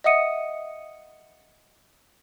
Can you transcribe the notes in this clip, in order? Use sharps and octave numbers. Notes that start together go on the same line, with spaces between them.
D#5 E5 F#5 D#6 C#7 D#7